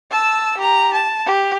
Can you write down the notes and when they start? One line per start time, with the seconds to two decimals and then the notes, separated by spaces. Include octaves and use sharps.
0.11 A5 E6
0.58 G4 A#5
0.94 A5
1.26 G4